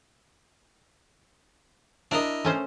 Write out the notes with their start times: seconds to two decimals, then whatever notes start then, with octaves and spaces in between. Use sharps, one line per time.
2.11 D4 E4 A#4 D#5
2.45 A3 C#4 C5